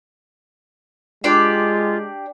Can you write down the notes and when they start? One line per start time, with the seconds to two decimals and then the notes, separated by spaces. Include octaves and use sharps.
1.24 G#3 D4 F4 G4 D5